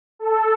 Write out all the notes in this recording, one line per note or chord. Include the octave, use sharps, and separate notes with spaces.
A4